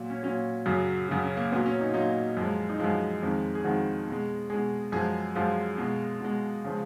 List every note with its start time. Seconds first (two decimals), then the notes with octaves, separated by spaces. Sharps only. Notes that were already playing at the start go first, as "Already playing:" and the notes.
Already playing: A#2 F#3
0.10 C#4
0.23 A#2 F#3 C#4
0.66 F#2 C#3 F#3
1.09 F#2 C#3 F#3
1.23 C#4
1.37 A#3
1.52 A#2 B3
1.56 F#3
1.66 C#4
1.81 D#4
1.89 F4
1.94 A#2 F#3 D#4
2.37 F#2 F3 G#3
2.69 D#4
2.79 F#2 F3 G#3 F4
3.22 F2 D#3 G#3
3.55 G#4
3.65 F2 D#3 G#3 F#4
4.08 B2 G#3
4.50 B2 G#3 G#4
4.92 F#2 F3 G#3 G#4
5.35 F#2 F3 G#3 F4
5.78 B2 G#3
6.21 B2 G#3
6.64 C#3 F3 G#3